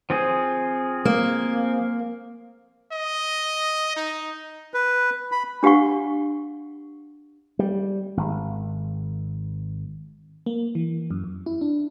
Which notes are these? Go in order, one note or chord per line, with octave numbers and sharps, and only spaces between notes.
F3 C4 G#4
A#3
D#5
D#4
B4
B5
D4 G4 F5 F#5 C#6
G3
G#1
A#3
E3
F#2
F2
E4
D4